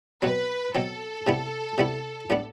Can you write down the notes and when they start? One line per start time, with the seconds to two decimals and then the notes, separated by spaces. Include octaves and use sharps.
0.22 B2 F#3 C4 B4
0.75 B2 F#3 C4 A4
1.27 C3 G3 B3 E4
1.78 C3 G3 B3 E4
2.30 A2 G3 B3 D4